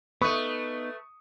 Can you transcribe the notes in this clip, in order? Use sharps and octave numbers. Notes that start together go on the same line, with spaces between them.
A3 B3 D#4 B4 C#6 D#6